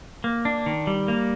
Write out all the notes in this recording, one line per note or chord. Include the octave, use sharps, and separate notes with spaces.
A#3
D4
D#3
G3
A#3